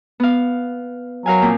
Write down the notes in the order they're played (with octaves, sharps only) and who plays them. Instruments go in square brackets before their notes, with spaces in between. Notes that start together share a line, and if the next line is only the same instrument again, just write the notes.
[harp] B3 F5
[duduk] F#3 [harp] A#4 F5 G#5
[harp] A#2 F3 C4